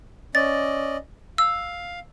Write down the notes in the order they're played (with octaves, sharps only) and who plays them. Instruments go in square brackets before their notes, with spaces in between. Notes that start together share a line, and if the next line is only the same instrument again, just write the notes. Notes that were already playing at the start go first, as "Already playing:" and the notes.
[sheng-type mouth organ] C#4 D5 D#5 [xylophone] A6
[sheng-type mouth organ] F5 [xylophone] E6